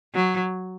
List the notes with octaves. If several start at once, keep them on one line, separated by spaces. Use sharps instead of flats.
F#3